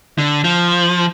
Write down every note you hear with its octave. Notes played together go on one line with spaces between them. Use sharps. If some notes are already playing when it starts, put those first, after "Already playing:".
D3
F3